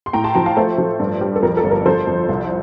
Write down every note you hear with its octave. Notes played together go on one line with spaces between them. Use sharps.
C6
A2 G5 A#5
A5 C6
F3 G5 A#5
F5 A5
A3 A4 C5
F3
G2
G3
A4
F2 A#4
A4
G1
A#4
F3 A4 C5
F2
C2